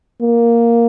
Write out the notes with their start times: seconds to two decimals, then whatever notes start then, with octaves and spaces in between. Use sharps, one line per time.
0.22 A#3